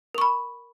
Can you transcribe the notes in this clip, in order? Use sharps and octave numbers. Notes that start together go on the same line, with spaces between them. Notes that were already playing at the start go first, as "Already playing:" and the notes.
A#4 B5 C#6